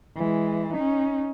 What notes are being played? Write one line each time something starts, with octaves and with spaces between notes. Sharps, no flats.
E3 G#3
C#4 D#4